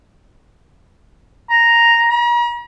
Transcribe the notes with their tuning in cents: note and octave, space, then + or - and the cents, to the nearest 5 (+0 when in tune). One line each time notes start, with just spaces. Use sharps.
A#5 +0
A#5 +45